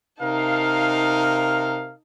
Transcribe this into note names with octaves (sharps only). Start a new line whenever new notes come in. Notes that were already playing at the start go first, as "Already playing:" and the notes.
C3 D#4 A#4 F5 A5